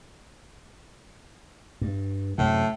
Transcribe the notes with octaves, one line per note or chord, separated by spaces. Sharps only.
G2
F#2 A2 C3